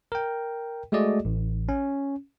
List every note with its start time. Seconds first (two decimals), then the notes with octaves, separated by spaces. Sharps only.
0.12 A#4 G5
0.92 G#3 A3 F#4 G#4 D5 D#5
1.25 A1
1.69 C#4